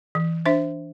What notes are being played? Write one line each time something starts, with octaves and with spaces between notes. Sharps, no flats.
E3
D4 C5 E5